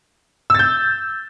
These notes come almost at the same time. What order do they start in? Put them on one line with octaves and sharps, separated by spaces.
E6 A6 G6